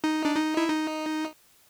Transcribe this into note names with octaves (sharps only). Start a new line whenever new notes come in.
D#4
D4
D#4
E4
D#4